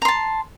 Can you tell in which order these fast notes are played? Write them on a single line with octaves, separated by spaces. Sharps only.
A#5 C6 A5